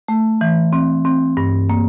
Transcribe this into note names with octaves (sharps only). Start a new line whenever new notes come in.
A3
E3
C4
C4
G2
A#3